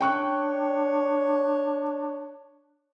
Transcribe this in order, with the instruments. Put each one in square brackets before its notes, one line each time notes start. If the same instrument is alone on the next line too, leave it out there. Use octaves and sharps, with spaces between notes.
[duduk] D4 [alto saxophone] C#5 [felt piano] G5 C#6 F#6